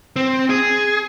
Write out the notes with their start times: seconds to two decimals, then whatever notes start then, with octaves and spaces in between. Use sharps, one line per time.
0.16 C4
0.50 G#4